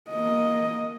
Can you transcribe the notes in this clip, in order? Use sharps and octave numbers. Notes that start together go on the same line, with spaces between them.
A#3 D#5